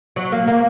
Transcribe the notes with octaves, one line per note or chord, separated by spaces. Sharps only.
F#3
A#3
A#3